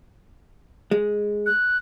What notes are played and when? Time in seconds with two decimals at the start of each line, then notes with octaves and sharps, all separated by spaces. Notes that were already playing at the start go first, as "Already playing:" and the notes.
0.91 G#3
1.46 F#6